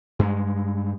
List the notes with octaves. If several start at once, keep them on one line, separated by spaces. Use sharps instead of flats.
G2 G#3